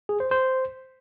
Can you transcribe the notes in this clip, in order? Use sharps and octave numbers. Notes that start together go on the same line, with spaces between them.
G#4
C5
C5